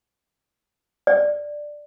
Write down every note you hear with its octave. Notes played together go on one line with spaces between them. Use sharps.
D5